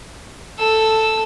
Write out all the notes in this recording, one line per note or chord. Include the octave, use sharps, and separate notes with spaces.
A4 E6